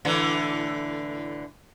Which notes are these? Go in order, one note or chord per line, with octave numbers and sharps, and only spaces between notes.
A2 D3 E3